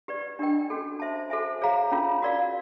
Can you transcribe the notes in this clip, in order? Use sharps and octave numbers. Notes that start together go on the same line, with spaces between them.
G4 B4 D5
D4 G4 A#4 D#5 G5
C#4 F#4 A4
C5 E5 A5
F#4 A4 C5 E5 G#5
G#4 C#5 F5 A#5
C#4 F4 A#4
F#4 A#4 D5 F5